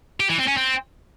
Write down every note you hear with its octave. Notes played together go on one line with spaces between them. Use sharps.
G4
E3
C4
C#4
C4